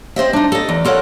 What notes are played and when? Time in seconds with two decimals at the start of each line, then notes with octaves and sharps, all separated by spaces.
0.16 C4 C5 D#5 E5
0.33 D4 D#4
0.52 A4 D#5
0.69 E2
0.85 F4 A4 A#4 C#5 F#5